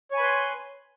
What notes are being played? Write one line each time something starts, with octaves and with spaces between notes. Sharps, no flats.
B4 C#5 G#5 B5 C6